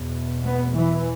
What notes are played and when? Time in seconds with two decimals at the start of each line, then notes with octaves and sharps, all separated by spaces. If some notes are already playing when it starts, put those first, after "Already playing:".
Already playing: E2 B2
0.43 B3
0.74 E3